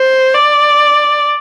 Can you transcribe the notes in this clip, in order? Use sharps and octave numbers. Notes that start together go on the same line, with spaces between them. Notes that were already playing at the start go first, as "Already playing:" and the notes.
Already playing: C5
D5